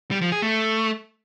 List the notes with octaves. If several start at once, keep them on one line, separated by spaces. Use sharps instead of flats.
G3
F3
G#4
A3